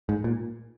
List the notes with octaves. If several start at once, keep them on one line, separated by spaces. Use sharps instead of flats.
G#2
A#2